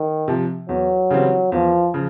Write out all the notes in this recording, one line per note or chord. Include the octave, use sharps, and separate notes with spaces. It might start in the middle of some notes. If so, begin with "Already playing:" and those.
Already playing: D#3
C3 F3
E2 F#3
C#3 E3 G3 C4
E2 F3
C#3 F3